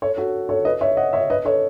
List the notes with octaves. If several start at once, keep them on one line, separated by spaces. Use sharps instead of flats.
A4 C#5
F#4 A4
A4 C#5
B4 D#5
C#5 E5
D#5 F#5
C#5 E5
B4 D#5
A4 C#5